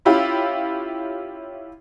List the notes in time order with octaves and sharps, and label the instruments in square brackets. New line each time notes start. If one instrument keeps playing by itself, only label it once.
[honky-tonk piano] C#4 E4 F4 G4